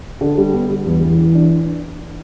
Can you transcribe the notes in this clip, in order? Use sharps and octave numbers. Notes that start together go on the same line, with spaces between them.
D3
G3
B3
G3
E2
E3
E3
D4
D4